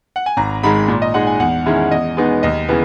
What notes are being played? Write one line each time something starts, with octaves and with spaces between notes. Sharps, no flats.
F#5
G#5
G#1 A#5
G#2 D#3 G#3 B5
A#2
D#5
G#3 D#4 F#5
G#5
E2 F#5
D#3 G#3 C#4 E4
E2 D#5
B2 G#3 B3 D#4
D#2 D#5
C#3 E3 B3